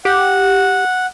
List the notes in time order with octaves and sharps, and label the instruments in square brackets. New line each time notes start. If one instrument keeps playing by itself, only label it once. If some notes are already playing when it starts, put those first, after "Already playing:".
[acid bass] G4 [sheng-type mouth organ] F#5